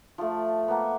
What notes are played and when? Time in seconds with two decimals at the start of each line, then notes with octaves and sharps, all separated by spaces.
0.18 F3 A3
0.68 A#3 B3